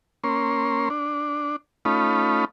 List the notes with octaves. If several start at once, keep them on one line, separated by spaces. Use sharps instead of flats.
A#3 C#4 C6
D4
A3 C#4 D#4 F4 B5